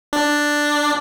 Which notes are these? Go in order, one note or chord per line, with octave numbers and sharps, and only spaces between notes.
D4